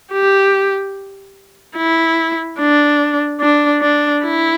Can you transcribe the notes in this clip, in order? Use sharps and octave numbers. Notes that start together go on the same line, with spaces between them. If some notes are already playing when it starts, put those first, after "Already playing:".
G4
E4
D4
D4
D4
E4